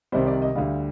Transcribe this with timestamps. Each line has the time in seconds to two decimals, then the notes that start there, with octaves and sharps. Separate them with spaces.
0.12 C2 C3 D#3 G3 C5
0.27 D5
0.42 D#5
0.55 D2 D3 G3 F5